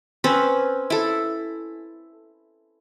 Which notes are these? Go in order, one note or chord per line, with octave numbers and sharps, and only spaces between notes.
C4 C#4 B4
E4 A4